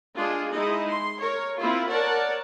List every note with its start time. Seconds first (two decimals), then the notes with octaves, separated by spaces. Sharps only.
0.16 G#3 D4 F4 G#4
0.52 G#3 D#4 E4 D#5
0.90 C6
1.20 A#4 C#5
1.59 A#3 C4 E4 F4
1.89 A#4 C#5 D5 F#5 A5